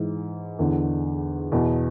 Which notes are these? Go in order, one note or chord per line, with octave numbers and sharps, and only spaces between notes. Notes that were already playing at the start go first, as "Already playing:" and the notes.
Already playing: G#2 E3
E2 D3
E2 B2